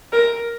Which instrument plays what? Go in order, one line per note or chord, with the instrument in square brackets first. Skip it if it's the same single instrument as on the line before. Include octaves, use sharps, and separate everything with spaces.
[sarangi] A#4